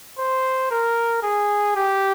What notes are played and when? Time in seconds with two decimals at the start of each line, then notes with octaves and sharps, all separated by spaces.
0.18 C5
0.71 A#4
1.23 G#4
1.76 G4